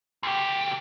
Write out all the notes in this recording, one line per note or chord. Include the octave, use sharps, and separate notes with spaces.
D2 G4